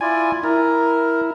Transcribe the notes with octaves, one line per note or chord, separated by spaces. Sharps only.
E4 F4 D5 G#5
E4 A#4